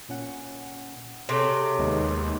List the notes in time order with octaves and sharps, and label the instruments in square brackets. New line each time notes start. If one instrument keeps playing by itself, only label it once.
[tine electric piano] A#2 C#4 F#5
[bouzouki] C3 [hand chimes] G#4 A4 C#5 [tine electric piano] G5
[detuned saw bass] D#2 [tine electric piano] G#3 B3 D#4